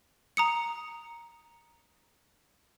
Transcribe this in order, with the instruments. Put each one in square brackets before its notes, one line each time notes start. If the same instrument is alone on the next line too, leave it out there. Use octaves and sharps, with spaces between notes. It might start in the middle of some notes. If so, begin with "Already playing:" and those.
[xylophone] A#5 D#6 C#7